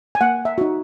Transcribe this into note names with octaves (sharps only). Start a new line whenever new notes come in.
G#5
A#3 F#5
E5
D#4 F#4